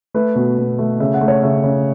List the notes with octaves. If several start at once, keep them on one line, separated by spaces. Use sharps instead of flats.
A3 B4
B2
B2
A3
C#3 E5
F#5
A3
C#5
C#3 E5
C#3